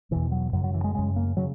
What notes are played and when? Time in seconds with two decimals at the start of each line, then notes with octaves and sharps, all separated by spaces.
0.11 E2 B2 E3
0.32 F#3
0.53 F#2 C#3 F#3
0.64 F#3
0.74 E3
0.84 G#3
0.95 F#2 C#3 G#3
1.16 A#3
1.37 C#3 F#3